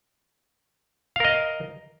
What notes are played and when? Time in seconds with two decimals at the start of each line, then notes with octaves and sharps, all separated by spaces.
1.16 F5
1.20 A#4
1.25 D#5